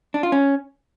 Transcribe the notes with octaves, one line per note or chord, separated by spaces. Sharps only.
D4
F4
C#4